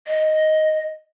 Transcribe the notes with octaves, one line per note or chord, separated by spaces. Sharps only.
D#5